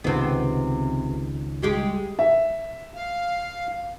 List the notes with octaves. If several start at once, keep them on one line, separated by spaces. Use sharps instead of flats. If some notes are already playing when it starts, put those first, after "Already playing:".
C#2 C3 D#3 B3
G3 G#3 G4
E5
F5